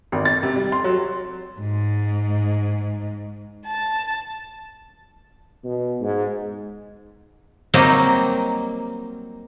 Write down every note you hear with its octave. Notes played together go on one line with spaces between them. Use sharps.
G#1
A6
C3
G3
C6
F#3
G#2
A5
B2
G#2
F#3 G3 A#3 C4 D#4 D#5